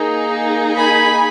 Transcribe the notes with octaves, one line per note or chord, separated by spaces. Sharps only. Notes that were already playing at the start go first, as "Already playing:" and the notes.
Already playing: A#3 D#4 G#4
G#5 B5